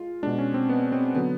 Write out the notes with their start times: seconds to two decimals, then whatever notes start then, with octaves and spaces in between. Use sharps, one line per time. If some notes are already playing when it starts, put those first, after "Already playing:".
Already playing: G#3 F4
0.23 B2 G#3 D4
0.39 C#4
0.54 C4
0.69 B3
0.92 C4
1.15 D3 F#3 B3